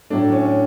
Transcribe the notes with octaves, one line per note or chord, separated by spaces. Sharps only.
A2 F#3 A3 D4
C#4